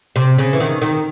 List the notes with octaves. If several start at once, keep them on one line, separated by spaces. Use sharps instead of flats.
C3
C#3
E3
D#3
D#3